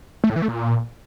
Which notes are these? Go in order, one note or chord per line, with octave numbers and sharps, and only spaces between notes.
A3
A2
E3
A3
A#2